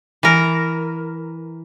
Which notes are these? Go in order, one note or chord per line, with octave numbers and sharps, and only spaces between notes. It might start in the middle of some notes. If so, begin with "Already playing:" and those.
E3 A#4